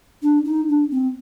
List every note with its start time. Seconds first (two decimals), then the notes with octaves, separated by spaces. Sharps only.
0.22 D4
0.45 D#4
0.68 D4
0.91 C4